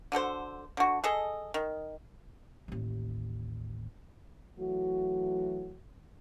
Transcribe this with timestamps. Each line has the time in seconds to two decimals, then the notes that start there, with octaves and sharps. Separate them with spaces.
0.12 D3 F#4 A4 C5
0.77 D3 F#4
1.04 G#4 A4 D#5
1.54 D#3
2.68 A1 D#2
4.59 E3 F#3 A3 F#4